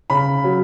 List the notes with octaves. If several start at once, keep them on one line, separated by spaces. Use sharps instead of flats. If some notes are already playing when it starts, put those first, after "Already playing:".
C#3 B5
F#3